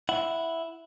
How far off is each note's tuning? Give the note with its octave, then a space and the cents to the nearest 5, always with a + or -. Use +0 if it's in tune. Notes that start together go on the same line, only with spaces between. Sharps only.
E4 +0 F#5 -5